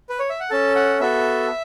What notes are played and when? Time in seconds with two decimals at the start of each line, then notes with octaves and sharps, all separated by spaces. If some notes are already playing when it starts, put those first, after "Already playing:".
0.09 B4
0.19 C#5
0.30 E5
0.40 F#5
0.50 C#4 A4 A5
0.75 F#5
1.00 B3 F#4 A4 E5